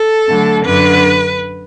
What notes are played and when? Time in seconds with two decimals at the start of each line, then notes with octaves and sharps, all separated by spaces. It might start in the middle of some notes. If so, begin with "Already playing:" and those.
Already playing: A4
0.27 D3 F#3 A3
0.64 F#2 D3 F#3 D4 B4